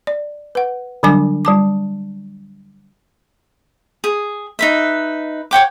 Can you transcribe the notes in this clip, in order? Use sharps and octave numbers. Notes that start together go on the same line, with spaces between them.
D5
B4 F#5
D3 F#3 G3 D4 G#5 D6
G3 A5 D6
G#4
D#4 B4 E5
C#5 F#5 G5 D6